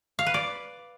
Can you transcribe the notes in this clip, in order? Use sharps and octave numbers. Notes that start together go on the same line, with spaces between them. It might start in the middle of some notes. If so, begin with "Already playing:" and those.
F5
B4
D5